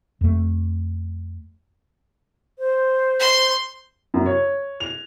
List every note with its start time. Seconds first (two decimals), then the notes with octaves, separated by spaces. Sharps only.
0.21 F2 A3
2.59 C5
3.20 C6
4.14 F#2
4.26 C#5
4.80 F7